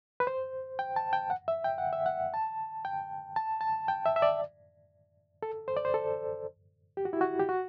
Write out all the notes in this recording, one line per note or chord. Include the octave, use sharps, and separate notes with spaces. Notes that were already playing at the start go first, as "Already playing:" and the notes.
B4
C5
G5
A5
G5
F#5
E5
G5
F#5
E5
F#5
A5
G5
A5
A5
G5
E5
E5
D5
A4
C5
D5
C5
A4
G4
F#4
E4
F#4
G4
F#4